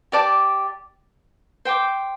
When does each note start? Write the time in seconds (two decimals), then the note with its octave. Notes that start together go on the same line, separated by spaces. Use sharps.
0.12 G4 D5 A5 D6
1.65 C5 G5 D6